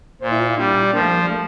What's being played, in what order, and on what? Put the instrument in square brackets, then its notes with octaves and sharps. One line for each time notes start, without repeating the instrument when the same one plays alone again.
[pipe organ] A#2 [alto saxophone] C5
[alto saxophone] E4
F4
E4
[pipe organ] G3 [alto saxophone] D4
[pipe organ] F3 [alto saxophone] A#3
[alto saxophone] A3
A#3
G3
A3